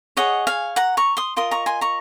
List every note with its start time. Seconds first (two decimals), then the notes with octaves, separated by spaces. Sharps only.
0.17 G#4 C#5 D#5 F#5
0.47 F5 G#5
0.76 F#5 A#5
0.97 A#5 C#6
1.17 C6 D#6
1.37 F4 A#4 D#5 C6 D#6
1.51 A#5 C#6
1.66 G#5 C6
1.81 A#5 C#6